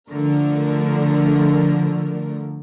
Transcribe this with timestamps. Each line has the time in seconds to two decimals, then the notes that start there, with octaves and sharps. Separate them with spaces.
0.11 D3 F3 A3 A#4